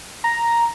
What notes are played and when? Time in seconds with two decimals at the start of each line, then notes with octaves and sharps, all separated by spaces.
0.24 A#5